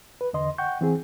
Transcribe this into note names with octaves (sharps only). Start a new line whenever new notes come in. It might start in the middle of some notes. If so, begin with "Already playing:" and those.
B4
E2 D3 D#5 C6
F#5 G5 C#6 G6
E3 C4 G#4